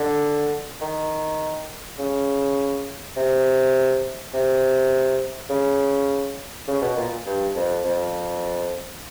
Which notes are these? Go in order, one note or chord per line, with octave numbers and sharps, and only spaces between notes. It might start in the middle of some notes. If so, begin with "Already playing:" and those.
Already playing: D3
D#3
C#3
C3
C3
C#3
C#3
B2
A#2
G2
F2
F2